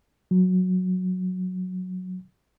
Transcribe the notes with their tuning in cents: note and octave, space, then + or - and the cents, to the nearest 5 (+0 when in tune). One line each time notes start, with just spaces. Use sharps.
F#3 -10